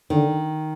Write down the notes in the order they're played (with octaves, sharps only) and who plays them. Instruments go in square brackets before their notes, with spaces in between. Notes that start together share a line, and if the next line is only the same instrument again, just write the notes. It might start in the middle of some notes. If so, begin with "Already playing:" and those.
[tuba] D3 [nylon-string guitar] D#3